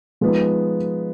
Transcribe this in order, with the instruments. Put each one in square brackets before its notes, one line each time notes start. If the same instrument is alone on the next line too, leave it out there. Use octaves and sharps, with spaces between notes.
[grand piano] F3 G#3 B3 D#4